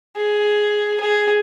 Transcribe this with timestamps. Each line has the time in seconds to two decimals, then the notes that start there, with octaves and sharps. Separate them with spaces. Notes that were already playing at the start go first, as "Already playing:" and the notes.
0.16 G#4
1.00 G#4